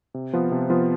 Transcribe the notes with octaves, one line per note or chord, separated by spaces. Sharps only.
C3
F3 B3 F4
C3
F3 B3 F4